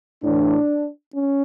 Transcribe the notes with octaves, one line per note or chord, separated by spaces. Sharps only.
A2 E3 D4
C#4